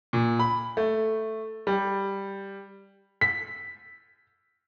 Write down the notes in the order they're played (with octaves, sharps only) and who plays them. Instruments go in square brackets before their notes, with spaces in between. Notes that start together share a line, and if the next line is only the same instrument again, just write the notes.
[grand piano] A#2
B5
A3
G3
[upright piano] B6